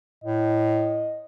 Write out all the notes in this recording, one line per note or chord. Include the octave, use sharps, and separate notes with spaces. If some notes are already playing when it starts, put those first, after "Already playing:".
A2 D#5